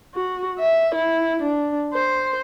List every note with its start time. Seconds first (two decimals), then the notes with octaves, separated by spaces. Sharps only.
0.14 F#4
0.59 E5
0.95 E4
1.43 D4
1.94 C5